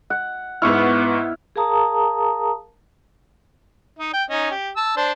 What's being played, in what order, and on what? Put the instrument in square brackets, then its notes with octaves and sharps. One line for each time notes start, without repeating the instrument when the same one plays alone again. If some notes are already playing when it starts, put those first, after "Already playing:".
[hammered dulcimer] F#5
[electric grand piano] G#2 C#6 F6 [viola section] B3 [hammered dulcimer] E4
[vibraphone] G#4 A#4 F5 A5 A#5 D#6
[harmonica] D#4
G5
C#4 D#4 D#5
G4
A5 E6
D4 C5 A5